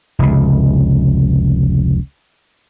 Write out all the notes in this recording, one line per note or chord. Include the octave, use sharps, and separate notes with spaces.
F1 C#2